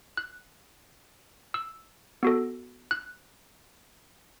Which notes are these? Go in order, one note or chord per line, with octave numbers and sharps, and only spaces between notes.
F#6
E6
B3 F#4 A4
F#6